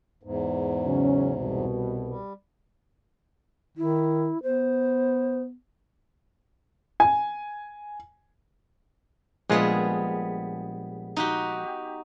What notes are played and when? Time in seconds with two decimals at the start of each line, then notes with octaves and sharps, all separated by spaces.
0.23 E2 G#2
0.86 C#3 F#3 C#4
1.38 C2 B2
2.08 G3
3.77 D#3 E4
4.43 B3 C5
7.00 G#5
9.49 A#1 G3 G#3 B3 F4 G#4
11.16 D#4 F#4 G4